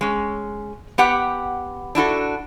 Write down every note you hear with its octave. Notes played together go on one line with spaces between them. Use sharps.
G#3 C#4
B3 G4 F#5 G5
D4 E4 F#4 A4